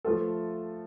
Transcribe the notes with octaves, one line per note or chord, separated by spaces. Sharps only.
F3 A3 F4 A4